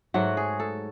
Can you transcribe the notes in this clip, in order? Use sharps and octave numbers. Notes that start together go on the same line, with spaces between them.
G#2 F#3 A3 F#4
G#4
A4